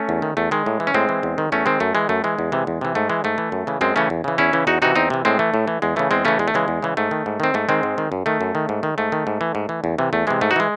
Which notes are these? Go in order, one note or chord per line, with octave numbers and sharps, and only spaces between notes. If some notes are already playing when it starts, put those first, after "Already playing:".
Already playing: A3 C#4
E2
D#3
E2 A3
D#3 G#3
A2
E3
C#4
A2 G#3 C4
E3
E2
D#3
E2 A3 C#4
D#3 G#3 C4
F#2 A3
E3 G#3
F#2 A3
E3 G#3
E2
C3 E3
E2
C3 E3
G#2 A3
E3 G#3
G#2 A3
E3
F#2
C#3 E3
F#2 G#3 C4
C#3 E3 A3 C#4
E2
C#3 E3
E2 C#4 E4
C#3 E3
E2 D#4 F#4
C3 E3 D#4 F#4
E2 C4 D#4
C3 E3
A2 G#3 C4
E3 A3
A2
E3
E2 G#3
C#3 E3 A3
E2 G#3 C4
C#3 E3 A3 C#4
E2 G#3
A3
C#3 E3 G#3
E2
C#3 E3
G#2 A3
D#3
G#2
D#3 C4
G#2 A3
D#3 G#3 C4
G#2
D#3
F#2
D#3 A3
F#2
D#3
G#2
D#3
G#2 A3
D#3
G#2
E3
G#2
E3
E2
C3 E3
E2 A3
C3 E3 G#3
G#2 A3
D#4 F#4
E3 G#3